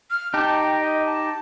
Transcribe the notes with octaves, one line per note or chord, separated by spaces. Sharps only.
F6
D#4 G4 A5
G5
D#5
A5